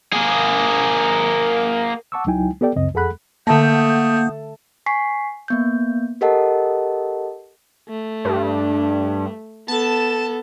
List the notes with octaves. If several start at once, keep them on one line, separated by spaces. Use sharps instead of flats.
A#3 G#4
F#5 A5 C#6 D6 E6
C#2 F#3 D#4 E4 G5 G#5
B3 G4 A4 D5 G5
C#2 F#2 C#3 C4 D#5
F2 G#4 A4 F#5 B5 F#6
D3 A3 A#3 F#5 A5 D#6 G6
G#5 C#6 B6 C7
A#3 B3 G6
G4 A4 A#4 D#5 F#5 A5
A3
G2
B3 A4 A5